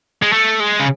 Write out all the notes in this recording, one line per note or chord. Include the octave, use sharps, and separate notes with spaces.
G#3
A3
G#3
C#3